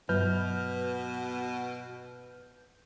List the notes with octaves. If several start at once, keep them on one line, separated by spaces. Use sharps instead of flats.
G2 B2 F#3 B4 F6 G6